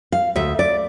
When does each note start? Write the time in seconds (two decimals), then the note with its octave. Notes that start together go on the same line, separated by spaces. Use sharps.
0.12 F5
0.36 D2 E5
0.59 D5